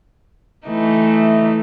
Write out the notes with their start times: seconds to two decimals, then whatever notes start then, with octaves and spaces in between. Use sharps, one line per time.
0.67 E3 A3 D#4